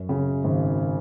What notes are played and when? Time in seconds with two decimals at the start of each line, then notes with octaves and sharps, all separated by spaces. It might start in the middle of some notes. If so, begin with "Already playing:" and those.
Already playing: F#2
0.09 C#3
0.44 G#1